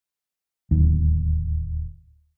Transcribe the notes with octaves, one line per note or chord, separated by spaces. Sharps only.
D1 D#2